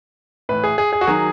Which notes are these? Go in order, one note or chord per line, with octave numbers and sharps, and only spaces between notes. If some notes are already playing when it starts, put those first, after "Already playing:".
A2 E3 B4
G#4
G#4
G#4
F#4
D#3 F#3 G#4